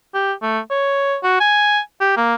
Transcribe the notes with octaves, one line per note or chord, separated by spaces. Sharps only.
G4
A3
C#5
F#4
G#5
G4
A#3